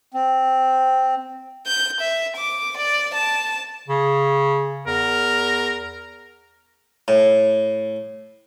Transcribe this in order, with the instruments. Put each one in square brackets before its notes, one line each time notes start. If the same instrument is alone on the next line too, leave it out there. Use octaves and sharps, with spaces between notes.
[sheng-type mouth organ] C4
[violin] G6
E5
D6
D5
A5
[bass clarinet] C#3
[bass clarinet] E2 [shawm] A#4
[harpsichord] A2